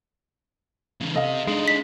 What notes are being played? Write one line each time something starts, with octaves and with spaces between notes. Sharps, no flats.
C#3 E3
C3 A4 D#5 F5
G#3 D4 D#4
B6